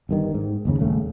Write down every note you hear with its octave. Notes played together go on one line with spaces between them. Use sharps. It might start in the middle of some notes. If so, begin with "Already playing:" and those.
G1 G2 D#3
G#2
F#1 D#2 C#3
D#1 C#3 A3